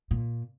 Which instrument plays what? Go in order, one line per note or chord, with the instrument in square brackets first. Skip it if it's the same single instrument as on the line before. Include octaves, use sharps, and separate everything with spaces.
[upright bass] A#2